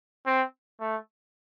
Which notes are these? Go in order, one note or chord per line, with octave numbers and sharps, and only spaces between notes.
C4
A3